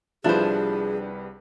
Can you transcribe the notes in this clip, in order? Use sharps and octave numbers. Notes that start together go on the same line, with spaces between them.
C2 F3 G3 D4 E4 G#4 B4 C5